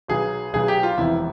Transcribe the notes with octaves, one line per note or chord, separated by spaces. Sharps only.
B1 B2 F#3 G#4
B1 B2 F#3 G#4
G4
F4
E1 E2 C3 F3 E4